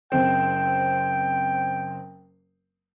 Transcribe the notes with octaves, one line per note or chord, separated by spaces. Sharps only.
F#1 C4 G5